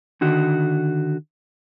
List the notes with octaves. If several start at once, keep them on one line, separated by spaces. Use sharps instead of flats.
D3 D#3 F#4